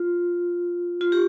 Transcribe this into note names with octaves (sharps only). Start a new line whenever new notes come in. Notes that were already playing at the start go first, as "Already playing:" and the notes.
Already playing: F4
F4
G4